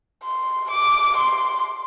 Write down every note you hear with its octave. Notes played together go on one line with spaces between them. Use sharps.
C6
D6
C6